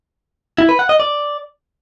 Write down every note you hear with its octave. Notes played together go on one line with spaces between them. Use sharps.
E4
B4
F#5
D#5
D5